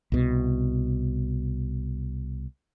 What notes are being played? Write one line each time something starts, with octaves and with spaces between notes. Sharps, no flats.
C2 B2